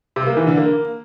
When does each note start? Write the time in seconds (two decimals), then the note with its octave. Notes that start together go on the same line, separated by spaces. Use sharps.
0.16 C3
0.26 A#3
0.37 E3
0.47 D3
0.57 A#3